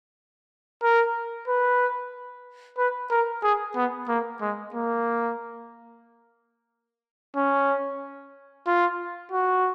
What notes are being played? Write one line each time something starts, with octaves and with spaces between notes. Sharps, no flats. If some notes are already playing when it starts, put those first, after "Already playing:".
A#4
B4
B4
A#4
G#4
B3
A#3
G#3
A#3
C#4
F4
F#4